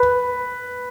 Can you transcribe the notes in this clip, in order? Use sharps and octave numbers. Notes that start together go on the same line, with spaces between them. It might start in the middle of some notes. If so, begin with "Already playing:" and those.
Already playing: B4